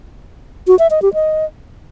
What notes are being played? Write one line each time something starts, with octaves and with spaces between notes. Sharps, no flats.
F#4
E5
D#5
G4
D#5